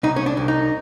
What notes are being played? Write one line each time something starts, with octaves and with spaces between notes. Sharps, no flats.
C2 D#4
C#4
D4
C2
D#4